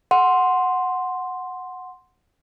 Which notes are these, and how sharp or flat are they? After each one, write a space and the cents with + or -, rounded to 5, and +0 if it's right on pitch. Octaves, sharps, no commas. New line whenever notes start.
F#5 -5 C6 +0